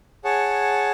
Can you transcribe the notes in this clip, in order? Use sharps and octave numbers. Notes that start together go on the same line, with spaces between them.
G#4 C#5 F#5 A5